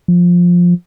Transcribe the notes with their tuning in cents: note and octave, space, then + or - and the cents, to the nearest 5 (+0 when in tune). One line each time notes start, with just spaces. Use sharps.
F3 +10